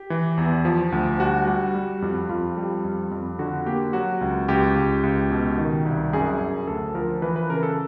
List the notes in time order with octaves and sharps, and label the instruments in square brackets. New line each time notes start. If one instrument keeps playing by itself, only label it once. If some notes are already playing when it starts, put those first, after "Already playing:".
Already playing: [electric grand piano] G4
E3
E2
F3
D2
G3 F#4
G3
G3
F2
F2 F4
G3
F2
F2
D3 F#4
A#3 G4
F#3 F#4
C#2
C#2 G4
C#2
C#2
B2
D#3
C2
F#2 G#4
F#2
D2 A4
F3 A#4
E3 B4
B4
C#3 A#4
A4